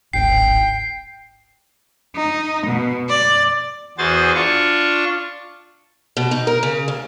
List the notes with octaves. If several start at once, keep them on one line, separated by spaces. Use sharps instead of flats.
D1 G#1 G5 C7
D#4
B2
D5
E2 F#4 G#4 C5 A6
D4 F4 C#6
B2
D#4
A#4
C#3
D2